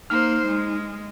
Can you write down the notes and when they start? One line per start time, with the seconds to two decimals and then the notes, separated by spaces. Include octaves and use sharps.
0.10 A#3 D#4 C5 F6
0.47 G#3